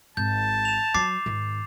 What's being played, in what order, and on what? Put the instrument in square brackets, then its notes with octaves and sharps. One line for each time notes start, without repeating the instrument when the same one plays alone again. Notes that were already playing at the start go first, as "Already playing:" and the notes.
[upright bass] G#1 [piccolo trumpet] A5 [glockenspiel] G6
[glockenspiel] E7 F7
[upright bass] F#3 [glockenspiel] D6 A6 C7
[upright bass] G#2 D#3